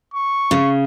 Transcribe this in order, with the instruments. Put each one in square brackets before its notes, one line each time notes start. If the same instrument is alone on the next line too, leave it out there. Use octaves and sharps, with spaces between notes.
[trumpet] C#6
[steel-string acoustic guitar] C#3